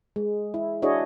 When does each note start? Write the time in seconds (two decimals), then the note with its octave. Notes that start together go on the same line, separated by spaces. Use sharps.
0.16 G#3
0.54 E4
0.82 D4 E4 F#4 G#4 C#5 D#5